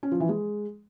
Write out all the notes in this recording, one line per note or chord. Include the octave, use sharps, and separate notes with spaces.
C#4
F3
E3
G#3